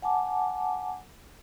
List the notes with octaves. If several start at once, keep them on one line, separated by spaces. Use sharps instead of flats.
F#5 G#5 A5 D6